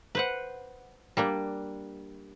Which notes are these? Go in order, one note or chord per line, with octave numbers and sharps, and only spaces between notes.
B4 C5 F#5
G3 A#3 D4